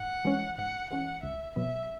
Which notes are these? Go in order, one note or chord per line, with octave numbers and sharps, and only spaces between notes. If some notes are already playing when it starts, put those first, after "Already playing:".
Already playing: G#2 F#5
E3 G#3 C#4
G#2 F#5
E3 G#3 C#4 F#5
C#2 E5
B2 F#3 B3 E5